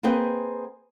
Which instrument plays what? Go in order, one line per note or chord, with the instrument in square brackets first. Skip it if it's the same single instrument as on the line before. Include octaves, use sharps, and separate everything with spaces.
[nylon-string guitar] A#3 C4 G#4 B4 D#5 G5